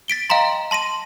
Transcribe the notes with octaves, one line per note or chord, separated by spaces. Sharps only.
A6 B6 D7 G7
D#5 F5 G5 A#5 C6
A5 C6 A#6 D#7